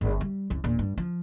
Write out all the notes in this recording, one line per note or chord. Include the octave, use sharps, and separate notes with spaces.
G1
G3
C2 F#2
E1 A#2
G2
F3